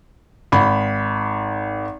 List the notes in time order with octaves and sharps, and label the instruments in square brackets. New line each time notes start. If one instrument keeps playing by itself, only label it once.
[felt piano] G#1 B5